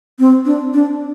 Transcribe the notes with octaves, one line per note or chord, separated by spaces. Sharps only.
C4
D4
D4